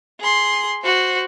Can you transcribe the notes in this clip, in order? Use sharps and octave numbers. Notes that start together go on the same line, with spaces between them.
G#4 C6
F#4 C5